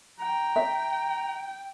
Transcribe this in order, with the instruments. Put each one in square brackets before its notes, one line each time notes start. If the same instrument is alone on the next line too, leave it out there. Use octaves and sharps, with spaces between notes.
[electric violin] G5 [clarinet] A#5
[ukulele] E5